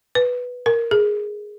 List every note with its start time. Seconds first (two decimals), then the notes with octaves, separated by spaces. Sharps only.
0.15 B4
0.66 A#4
0.91 G#4